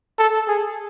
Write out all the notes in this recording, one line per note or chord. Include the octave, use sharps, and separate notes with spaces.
A4
G#4